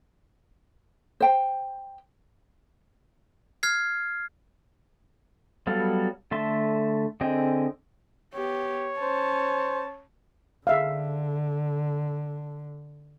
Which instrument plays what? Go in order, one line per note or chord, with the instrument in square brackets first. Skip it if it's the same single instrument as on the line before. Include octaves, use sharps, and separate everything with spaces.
[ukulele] C5 G5
[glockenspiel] F6 G#6 C7
[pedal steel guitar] F#3 G3 B3 A4 F5
D3 A3 E5 A5 C6
D3 C4 G#4 D#5 G5
[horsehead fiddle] B3 G4 [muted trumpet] C#5
[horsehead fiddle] C#4 A5 [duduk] C5
[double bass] D3 [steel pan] G#4 E5 F5